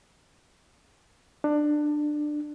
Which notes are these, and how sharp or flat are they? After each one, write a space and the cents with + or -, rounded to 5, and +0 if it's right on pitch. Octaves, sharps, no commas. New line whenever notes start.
D4 +20